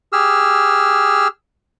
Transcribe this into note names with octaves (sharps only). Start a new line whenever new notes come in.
G4 G#4 E6 F6